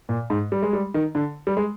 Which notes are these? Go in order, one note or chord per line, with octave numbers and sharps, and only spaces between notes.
A#2
G#2
G3
G#3
G3
D#3
D3
G3
G#3